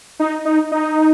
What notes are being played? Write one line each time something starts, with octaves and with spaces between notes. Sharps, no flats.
D#4
D#4
D#4